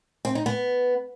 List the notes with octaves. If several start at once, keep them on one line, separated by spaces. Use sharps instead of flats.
C4
D#4
B3